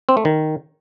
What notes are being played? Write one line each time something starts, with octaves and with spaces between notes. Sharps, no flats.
C4
A3
D#3